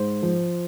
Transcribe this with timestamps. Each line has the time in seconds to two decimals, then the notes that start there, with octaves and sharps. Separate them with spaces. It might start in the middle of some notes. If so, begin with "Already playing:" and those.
Already playing: G#2 C5
0.22 F3